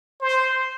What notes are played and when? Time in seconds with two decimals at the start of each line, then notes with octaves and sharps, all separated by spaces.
0.21 C5